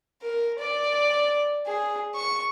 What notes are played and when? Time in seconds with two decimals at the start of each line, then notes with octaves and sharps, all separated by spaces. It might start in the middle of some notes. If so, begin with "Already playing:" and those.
0.22 A#4
0.59 D5
1.67 G#4
2.15 C#6